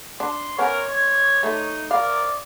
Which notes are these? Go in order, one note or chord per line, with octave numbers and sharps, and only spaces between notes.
D4 C6
B3 C#4 A#4 C#5
G#6
A3 D#4
A#4 D5 F5